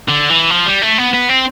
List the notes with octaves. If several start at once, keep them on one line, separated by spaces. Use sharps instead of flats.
D3
E3
F3
G3
A3
B3
B3
C4